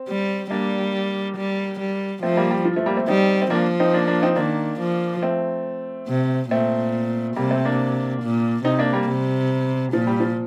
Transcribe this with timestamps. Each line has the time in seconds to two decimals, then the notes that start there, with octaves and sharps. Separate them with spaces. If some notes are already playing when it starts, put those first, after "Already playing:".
Already playing: C4
0.08 G3
0.50 G3 A#3 D4
1.37 G3
1.79 G3
2.23 F3 A3 C4
2.37 G3 A#3
2.50 G3
2.65 F3
2.76 F3 A3
2.86 G3 A#3
2.97 A3 C4
3.08 G3 C4 D#4
3.42 C4
3.50 F3 A#3 D4
3.80 C4 D#4
3.94 A#3 D4
4.07 A#3 D4
4.22 C4 D#4
4.36 D#3 A#3 D4
4.80 F3
5.22 A3 C4
6.08 C3
6.50 A#2 A3 C4
7.36 C3 G3 A#3
7.50 A3 C4
7.65 A#3 D4
8.22 A#2
8.64 C3 C4 D#4
8.79 A#3 D4
8.93 G3 A#3
9.07 C3 G3
9.93 A#2 F3
10.07 G3
10.20 F3